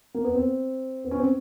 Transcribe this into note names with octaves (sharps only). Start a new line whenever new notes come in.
A#3
B3
C4
B3
C#4
C4